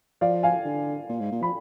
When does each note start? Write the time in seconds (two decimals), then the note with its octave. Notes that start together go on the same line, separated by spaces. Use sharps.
0.21 F3 D5 F5
0.43 F5 G#5
0.65 D3
1.09 A#2
1.20 G#2
1.31 A#2
1.42 F3 B5